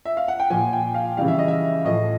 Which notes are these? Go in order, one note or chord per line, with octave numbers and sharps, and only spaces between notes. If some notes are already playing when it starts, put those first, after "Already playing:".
E5
F5
F#5
G5
A#2 F3 G#5
G5
F5
C#3 E3 G3 F5
E5
D#5
E5
A2 F3 D#5